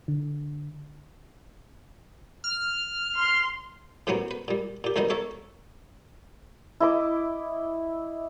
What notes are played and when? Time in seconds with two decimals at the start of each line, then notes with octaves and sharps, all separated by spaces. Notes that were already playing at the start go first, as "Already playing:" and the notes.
0.08 D3
2.44 F6
3.17 C6
4.07 A2 C3 F#3 A#3 B3 C#4
4.31 B4
4.48 A#2 G3
4.84 A#2 G4
4.96 D2 C3 D#3 G3 B3 D#5
5.10 A#3 A4 C#5 E5
6.80 E4 D#5 D6